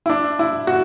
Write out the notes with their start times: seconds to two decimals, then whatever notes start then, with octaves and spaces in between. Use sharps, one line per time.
0.06 E4
0.10 D4
0.39 E4
0.67 F#4